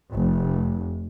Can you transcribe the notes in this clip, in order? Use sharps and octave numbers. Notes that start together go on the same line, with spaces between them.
F1